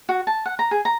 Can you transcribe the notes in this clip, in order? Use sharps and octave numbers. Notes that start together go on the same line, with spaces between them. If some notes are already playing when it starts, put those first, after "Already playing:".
F#4
A5
F#5
A#5
G#4
A#5